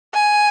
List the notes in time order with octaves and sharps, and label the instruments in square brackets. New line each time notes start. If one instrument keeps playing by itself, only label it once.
[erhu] G#5